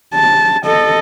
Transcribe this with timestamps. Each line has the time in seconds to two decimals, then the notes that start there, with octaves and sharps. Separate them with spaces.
0.14 A5
0.66 A4 D#5